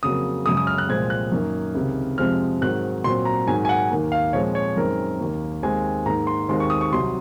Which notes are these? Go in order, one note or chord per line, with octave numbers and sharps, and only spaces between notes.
F2 C#3 F#3 A#3 D#6
F#2 C#3 G#3 D#6
D#6
F6
F#6
C2 A#2 F3 G#3 C4 G#6
F#6
F#2 D#3 A#3
C#2 C3 D#3
F2 C3 F3 G#3 C4 F6
G#2 D#3 F#3 C4 F#6
A#2 F#3 C4 C6
A#5
G#2 D#3 F#3 G#5
G#5
F#5
D#2 D#3 A#3
F5
A#2 F3 G#3 C4 C#5
C#5
F#2 D#3 G#3 C4 A#4
D#2 D#3 A#3
D#2 D#3 G#3 C4 G#5
G#2 D#3 A#3 A#5
C6
D#2 D#3 G#3 C4 C6
C#6
D#6
C#6
C2 C3 F#3 C6